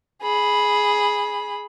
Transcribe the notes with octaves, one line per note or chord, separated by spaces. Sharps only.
G#4 B5